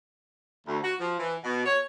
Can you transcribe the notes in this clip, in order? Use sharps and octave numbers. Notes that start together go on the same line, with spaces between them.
D2
F#4
F3
E3
B2
C#5